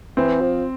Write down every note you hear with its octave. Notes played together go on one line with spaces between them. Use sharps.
E3 C4
F3